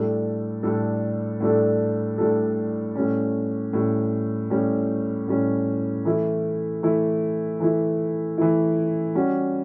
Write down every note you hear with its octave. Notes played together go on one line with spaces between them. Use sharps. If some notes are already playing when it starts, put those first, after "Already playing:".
Already playing: A2 G3 D4 A4
A2 G3 D4 A4
A2 G3 D4 A4
A2 G3 D4 A4
A2 G3 C#4
A2 G3 C#4
A2 G3 C#4
A2 G3 C#4
E3 A3 E4
E3 A3 E4
E3 A3 E4
E3 A3 E4
G3 C#4 F#4